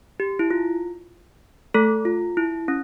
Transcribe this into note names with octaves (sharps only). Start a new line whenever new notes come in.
G4
E4
F4
A3 A4
F4
E4
C#4